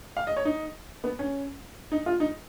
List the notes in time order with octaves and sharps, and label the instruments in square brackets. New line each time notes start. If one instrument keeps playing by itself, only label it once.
[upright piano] F5
D#5
C#5
D#4
B3
C#4
D#4
F4
D#4